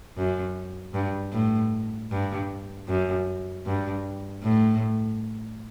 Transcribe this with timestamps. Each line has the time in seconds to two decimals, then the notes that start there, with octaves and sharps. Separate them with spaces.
0.17 F#2
0.94 G2
1.33 A2
2.11 G2
2.88 F#2
3.66 G2
4.43 A2